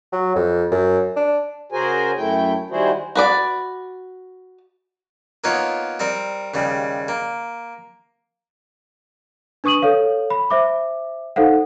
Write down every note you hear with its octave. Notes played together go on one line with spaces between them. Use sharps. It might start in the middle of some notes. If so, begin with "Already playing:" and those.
F#3
F2
F#2
D4
C#3 F#4 G#4 A#4 C5 G#5
F#2 A3 E4 G5
D#3 G3 E4 F#4 G#4 C5
F#4 B4 D5
A#3 B3 D#4 F4 B4 C#5
G3 C4 A#4
D#2 C#3 G3
A#3
D4 B4 C#6 D#6 D#7 F#7
A4 C#5 F5
B5
C5 E5 D6
D#4 A4 C5 F5 F#5